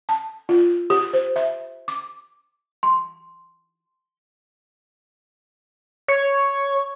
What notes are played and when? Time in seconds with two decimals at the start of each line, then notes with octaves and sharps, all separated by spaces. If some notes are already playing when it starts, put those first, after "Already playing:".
0.09 A5
0.49 F4
0.90 G4
1.13 C5
1.36 E5
1.88 D6
2.83 C6
6.08 C#5